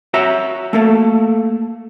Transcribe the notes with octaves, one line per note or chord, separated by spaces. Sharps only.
F#4 C#5 E5 A#5
A3 A#3 A4